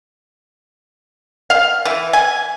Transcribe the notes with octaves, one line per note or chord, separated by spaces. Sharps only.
F5
E3
G#5